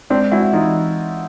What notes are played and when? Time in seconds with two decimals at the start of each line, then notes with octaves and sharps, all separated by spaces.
0.10 G#3 C4 D4
0.32 G#3 E4 F#4
0.53 E3 D#4 F4